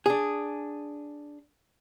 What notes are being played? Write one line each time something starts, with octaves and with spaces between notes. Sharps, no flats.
D4 G#4